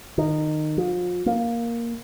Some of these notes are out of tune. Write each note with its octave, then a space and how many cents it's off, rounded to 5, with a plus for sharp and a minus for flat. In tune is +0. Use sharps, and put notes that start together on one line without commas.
D#3 -20
F3 +35
A#3 +5